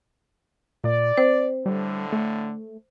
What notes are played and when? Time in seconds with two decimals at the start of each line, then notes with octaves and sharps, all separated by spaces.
0.84 A#2 D5
1.17 C4 C5
1.66 A2 D3 G3
2.12 A3